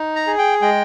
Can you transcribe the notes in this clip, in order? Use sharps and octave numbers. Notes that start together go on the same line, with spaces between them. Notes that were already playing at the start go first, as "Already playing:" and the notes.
Already playing: D#4
A#5
G#4
G5
G#3 G5